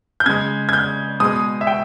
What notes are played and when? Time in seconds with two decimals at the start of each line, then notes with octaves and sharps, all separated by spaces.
0.20 G6
0.26 C#3 G#3 G#6
0.69 G#6
0.73 G6
1.20 B2 G#3 D#6
1.61 E5
1.67 G5